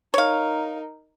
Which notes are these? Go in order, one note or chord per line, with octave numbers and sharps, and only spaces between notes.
D#4 A#4 C#5 F5